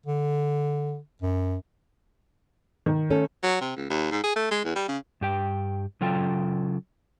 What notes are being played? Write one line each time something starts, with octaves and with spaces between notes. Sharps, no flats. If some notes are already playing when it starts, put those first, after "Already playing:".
D3
F#2
D#3
A3 C#4 A4
F#3
C3
C#2
D#2
G#2
G#4
A3
G#3
E2
G3
C#3
G2 G4 G5
C#3 F#3 F4 A4 G5